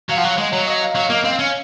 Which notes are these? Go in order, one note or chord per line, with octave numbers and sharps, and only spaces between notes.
F#3 F5
F3 F#5
F#3 F5
G#3 D#5
F#3 C#5
D#5
F5
F#3 F5
A#3 D#5
C4 F5
C#4 F5